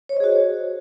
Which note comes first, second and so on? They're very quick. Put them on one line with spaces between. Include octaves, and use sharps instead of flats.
C#5 C5 D#5 G#4 F#4